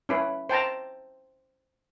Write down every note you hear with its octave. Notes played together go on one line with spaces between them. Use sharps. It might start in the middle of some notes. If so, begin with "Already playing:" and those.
C#4 E4 B4
C5 G5 A5 A#5